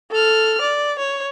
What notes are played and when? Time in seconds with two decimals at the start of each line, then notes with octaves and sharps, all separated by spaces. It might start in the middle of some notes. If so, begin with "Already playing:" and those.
0.11 A4 F6
0.61 D5
0.98 C#5